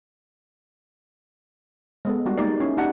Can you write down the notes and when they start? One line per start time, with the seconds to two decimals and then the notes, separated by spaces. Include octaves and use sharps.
2.05 G#3 B3 A4
2.26 G3 G#3 D4 F#4
2.38 G#3 A#3 D#4 G4 A#4 D5
2.60 C#4 E4
2.77 D4 D#4 G4 F#5 A5